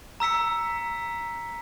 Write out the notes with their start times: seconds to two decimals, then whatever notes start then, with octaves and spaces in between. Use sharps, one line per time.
0.20 A#5 E6 B6 C#7